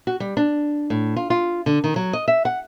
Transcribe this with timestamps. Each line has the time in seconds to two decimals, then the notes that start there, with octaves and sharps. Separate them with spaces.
0.07 F#4
0.20 G3
0.37 D4
0.90 A2
1.16 F4
1.30 F4
1.66 D3
1.84 D#3
1.96 F#3
2.13 D#5
2.28 E5
2.45 F#5